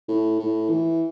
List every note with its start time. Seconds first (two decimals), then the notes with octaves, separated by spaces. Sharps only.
0.08 A2
0.39 A2
0.69 E3